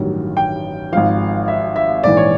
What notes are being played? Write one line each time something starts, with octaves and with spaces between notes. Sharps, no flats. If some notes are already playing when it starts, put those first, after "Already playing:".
Already playing: A1 G2 D#3 F#3
G5
G#1 G#2 F3 F5
E5
E5
A#1 G#2 E3 D5
C#5